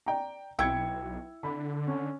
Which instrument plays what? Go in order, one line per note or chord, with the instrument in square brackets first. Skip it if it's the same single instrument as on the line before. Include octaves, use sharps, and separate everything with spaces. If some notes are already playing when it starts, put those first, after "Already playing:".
[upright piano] D5 G5 A#5
[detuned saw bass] B1 [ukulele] E4 G5 [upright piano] E6 G#6 C#7
[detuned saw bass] D3 [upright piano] B5
[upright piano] C#4